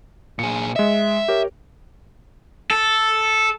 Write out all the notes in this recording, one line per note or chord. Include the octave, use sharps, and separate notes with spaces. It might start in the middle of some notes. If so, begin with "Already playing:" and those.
A#2 G#4 C#7
G#3 D#5 E5
G4 A#4 C#5
A4